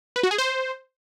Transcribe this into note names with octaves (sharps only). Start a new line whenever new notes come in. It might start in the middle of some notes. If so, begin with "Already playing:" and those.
B4
F#4
G#4
C5